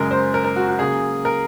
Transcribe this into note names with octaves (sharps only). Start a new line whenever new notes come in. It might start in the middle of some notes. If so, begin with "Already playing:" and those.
Already playing: F#2 C#3 G#3 A#4
C5
A#4
A#4
F#4
F#4
C#3 F#3 A#3 G#4
A#4